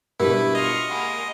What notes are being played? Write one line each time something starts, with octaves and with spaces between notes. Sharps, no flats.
B2 G3 D4 E4 G4 A#4 B4
F4 D#5 C#6
G#3 A#3 F#5 B5